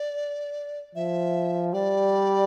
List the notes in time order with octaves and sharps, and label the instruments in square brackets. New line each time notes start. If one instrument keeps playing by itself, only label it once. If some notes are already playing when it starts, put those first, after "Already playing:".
Already playing: [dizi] D5
[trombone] F3 [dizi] E5
[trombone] G3 [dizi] D5